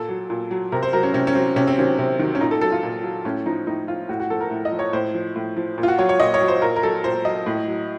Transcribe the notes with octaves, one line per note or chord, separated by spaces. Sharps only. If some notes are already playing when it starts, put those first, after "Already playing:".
Already playing: A#2 A4
F#3
A#2
F#3
C3 A#4
C5
F#3 A#4
C#4
C3 C#4
C#4
F#3 C4
C3 C#4
C4
D#3 F#3 C#4
C3
D#3 F#3
C#4
A#2 D#4
A4
F#3 A4
F4
A#2
F#3
A2 C#4
F3 D#4
A2 D#4
F3 F4
A2 F#4
F#4
F3 A4
A#4
A2
D#5
F3
C#5
A2 C5
F3
A2
F3
A#2
F4
F#4
F#3 C#5
C#5
A#2 D#5
C#5
F#3
C5
A#2 A#4
A#4
F#3 A4
A#2 C5
F#3 D#5
A2
F#3